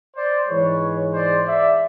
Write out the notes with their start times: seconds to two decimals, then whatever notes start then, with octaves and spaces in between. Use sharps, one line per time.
0.16 C5 D5
0.48 G#2 E3 G#3 B4 C#5
1.14 C5 D5
1.46 D5 E5